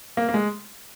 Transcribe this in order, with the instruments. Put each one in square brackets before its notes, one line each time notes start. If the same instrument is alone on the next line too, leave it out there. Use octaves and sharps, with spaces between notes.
[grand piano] A#3
A#3
G#3